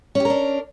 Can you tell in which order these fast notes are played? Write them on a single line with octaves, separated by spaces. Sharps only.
C#4 G4 A#4 D4